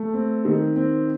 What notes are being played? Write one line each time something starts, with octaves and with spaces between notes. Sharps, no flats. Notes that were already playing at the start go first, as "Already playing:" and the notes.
Already playing: A3
C4
D#3
C4